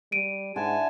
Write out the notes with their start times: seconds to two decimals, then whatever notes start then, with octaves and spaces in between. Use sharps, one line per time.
0.12 G3 D7 D#7
0.56 G#2 D3 E4 F#5 G#5 A5